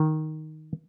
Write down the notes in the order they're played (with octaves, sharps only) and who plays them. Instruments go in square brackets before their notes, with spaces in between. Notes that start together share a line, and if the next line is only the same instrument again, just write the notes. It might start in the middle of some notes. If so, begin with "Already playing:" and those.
Already playing: [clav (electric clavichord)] D#3